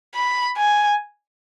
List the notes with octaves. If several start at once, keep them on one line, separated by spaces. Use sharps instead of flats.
B5
G#5